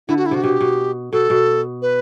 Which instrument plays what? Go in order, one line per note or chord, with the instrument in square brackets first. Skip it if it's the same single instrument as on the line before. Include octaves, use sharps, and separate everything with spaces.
[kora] D3 [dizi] E4
[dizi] F#4
E4
[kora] C3 [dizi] F#4
[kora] B2 [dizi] G4
[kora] B2
[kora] B2 [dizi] A4
[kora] B2
[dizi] B4